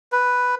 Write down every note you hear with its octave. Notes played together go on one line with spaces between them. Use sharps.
B4